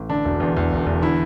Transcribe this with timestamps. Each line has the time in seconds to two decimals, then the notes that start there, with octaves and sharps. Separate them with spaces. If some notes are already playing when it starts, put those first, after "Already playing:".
Already playing: A1
0.09 D3 D4
0.25 E1
0.40 E2
0.57 E2
0.72 E1
0.86 E2
1.02 D3 E4